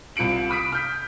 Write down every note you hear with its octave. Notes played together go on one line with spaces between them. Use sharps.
C2 F4 C#7 D7 F#7
B5 D#6 B6 D7
F6 G6 B6